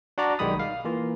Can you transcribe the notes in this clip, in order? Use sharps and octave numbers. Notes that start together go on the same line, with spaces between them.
D4 F#4 D5 A#5
B1 D#3 G3 G#3 B5 D#6
F5
E3 A#3 F4